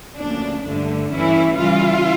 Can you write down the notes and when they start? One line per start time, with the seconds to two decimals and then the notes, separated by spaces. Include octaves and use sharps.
0.19 D2 C#3 F3 A#3 D4
0.65 G2 D3 A3 D4
1.13 G2 E3 A3 C#4 E4
1.59 C#3 E3 G3 F4